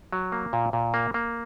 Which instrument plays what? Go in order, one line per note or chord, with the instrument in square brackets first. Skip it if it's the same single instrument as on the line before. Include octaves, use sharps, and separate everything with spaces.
[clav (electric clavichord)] F#3
A#3
A#2
A#2
A#3
A#3